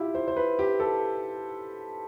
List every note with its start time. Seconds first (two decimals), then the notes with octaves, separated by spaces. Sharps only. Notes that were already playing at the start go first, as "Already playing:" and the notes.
Already playing: E4 F4 G4
0.15 C5
0.28 C5
0.37 B4
0.59 G4
0.80 A4